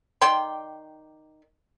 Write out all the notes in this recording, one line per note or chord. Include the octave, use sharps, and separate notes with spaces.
D#3 D5 G5 C6